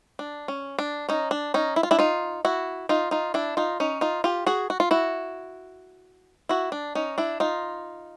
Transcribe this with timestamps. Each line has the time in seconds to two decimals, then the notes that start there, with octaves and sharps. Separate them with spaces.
0.19 D4
0.48 C#4
0.79 D4
1.09 C#4 D#4
1.31 D4
1.54 C#4 D#4
1.76 E4
1.83 F4
1.91 D4 E4
1.99 D#4 F4
2.45 E4 F#4
2.89 D#4 F4
3.11 D#4 F4
3.34 D4 E4
3.57 D#4 F4
3.80 C#4 D#4
4.01 D#4 F4
4.24 F4 G4
4.46 F#4 G#4
4.70 F#4
4.80 F4
4.91 E4 F#4
6.49 E4 F#4
6.72 D4
6.95 C#4 D#4
7.18 D4 E4
7.40 D#4 F4